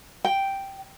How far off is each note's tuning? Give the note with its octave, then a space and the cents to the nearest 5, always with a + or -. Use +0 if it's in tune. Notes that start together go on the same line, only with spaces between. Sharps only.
G5 -5